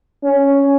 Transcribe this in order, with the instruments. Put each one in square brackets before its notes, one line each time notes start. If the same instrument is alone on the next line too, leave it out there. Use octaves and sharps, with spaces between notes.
[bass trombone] C#4